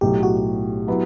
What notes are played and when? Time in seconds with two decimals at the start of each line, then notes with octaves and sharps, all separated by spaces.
0.01 B1 A2 F#3 G4
0.23 F#4
0.88 F#3 B3 E4